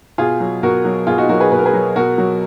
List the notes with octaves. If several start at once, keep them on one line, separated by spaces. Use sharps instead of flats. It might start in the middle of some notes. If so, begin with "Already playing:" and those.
B2 F4 G#4
F#3
B2 F#4 A#4
F#3
B2 F4 G#4
D#4 F#4
F#3 F#4 A#4
G#4 B4
B2 B4
A#4
G#4 B4
F#3
B2 F#4 A#4
F#3